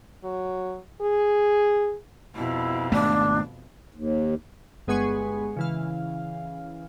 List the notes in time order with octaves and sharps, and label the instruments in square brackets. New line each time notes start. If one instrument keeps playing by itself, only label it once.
[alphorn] F#3
G#4
[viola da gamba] F2 B2 [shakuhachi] E4
[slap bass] G#1 A3 B3 [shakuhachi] D4
[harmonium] D#2
[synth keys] G1 G#3 B3 G#4 G#5 C#6
C#3 E3 F5